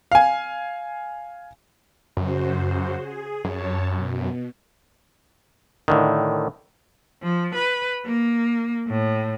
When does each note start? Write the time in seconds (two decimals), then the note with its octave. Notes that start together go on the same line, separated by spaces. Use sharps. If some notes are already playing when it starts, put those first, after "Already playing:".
0.12 F5 G#5
2.17 F#2 C#3 F#4 C5
2.97 G#4
3.45 F#2 C#5 A5
3.95 B2
5.88 A2 D3 D#3
7.23 F3
7.55 B4
8.06 A#3
8.88 A2